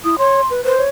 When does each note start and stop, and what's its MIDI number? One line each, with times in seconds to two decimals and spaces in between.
0.04 0.15 64
0.04 0.15 87
0.18 0.41 73
0.18 0.47 84
0.50 0.64 71
0.65 0.75 71
0.65 0.81 72
0.77 0.89 73